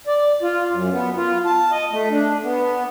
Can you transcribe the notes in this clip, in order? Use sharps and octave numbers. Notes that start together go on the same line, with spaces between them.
D5
F4
F#2
B3
F4
A5
D#5
A3
D4
B3